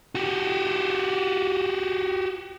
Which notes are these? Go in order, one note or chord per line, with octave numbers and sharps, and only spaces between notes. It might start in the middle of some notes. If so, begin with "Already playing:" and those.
F#4 G4